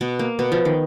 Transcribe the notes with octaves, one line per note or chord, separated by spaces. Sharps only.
B2 B3
A#3
B2 B3
F3
D#3